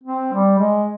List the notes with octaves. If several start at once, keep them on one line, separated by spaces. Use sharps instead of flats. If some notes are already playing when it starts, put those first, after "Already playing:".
C4
G3
G#3